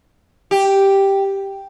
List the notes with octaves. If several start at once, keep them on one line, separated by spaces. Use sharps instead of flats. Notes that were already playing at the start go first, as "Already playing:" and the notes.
G4